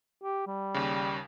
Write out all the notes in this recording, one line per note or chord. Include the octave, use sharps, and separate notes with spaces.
G4
G3
D#2 C#3